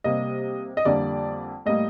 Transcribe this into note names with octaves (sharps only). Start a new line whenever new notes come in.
C3 G3 A#3 D#5
D#5
F2 D3 G3 A#3 D5
A2 G3 A#3 D#5